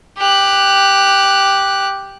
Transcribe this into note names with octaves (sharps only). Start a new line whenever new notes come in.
G4 F#6